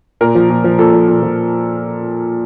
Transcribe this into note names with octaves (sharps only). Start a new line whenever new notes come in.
A#2 A#4
F3
A#2
F3
A#2 A4
F3
A#2
F3